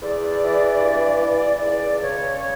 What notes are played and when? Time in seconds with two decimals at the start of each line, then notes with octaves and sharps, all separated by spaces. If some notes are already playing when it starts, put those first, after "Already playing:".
0.02 E2 D5
0.41 E3
0.81 G2
1.22 E3
1.61 C#2 D5
2.01 C#3 C#5
2.40 C#5